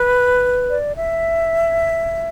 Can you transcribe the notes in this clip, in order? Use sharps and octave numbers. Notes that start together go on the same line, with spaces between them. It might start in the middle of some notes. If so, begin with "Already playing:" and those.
Already playing: B4
D5
E5